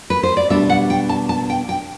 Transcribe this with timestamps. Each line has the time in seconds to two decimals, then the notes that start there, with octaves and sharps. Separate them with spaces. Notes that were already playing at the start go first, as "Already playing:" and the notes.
0.10 B4
0.23 C5
0.37 D5
0.50 B2 G3 B3 D4 E5
0.70 F#5
0.90 G5
1.09 A5
1.29 A5
1.50 G5
1.69 G5